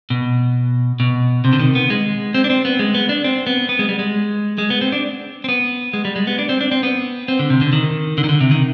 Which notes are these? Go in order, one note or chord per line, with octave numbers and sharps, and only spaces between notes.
B2
B2
C3
D3
D#3
B3
G#3
C4
D4
C4
B3
G#3
B3
D4
C4
B3
B3
G#3
G3
G#3
G#3
B3
C4
D4
C4
B3
G#3
G3
G#3
B3
D4
C4
D4
C4
B3
C4
D3
C3
D3
D#3
D3
D#3
D3
C3
D#3